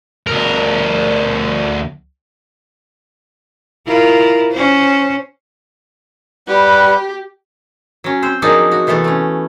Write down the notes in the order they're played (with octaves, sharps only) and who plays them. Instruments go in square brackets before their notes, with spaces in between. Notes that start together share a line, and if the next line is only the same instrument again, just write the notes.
[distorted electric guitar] D2 A#4
[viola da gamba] E4 F4 A#4
C#4 C5
[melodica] G3 B4 F#5 [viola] G4
[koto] F#3 C#4
C4 C5
F3 F#3 A#3 D4 D#4 G#4
F#4
C3 E3 A3 B3 A4
A3 C#4